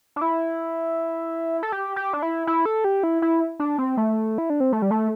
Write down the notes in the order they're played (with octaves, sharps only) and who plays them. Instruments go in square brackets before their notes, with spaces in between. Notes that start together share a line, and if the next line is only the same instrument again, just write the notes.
[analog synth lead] D4
E4
A4
G4
G4
D4
E4
E4
A4
G4
E4
E4
D4
C4
A3
E4
D4
C4
A3
G3
A3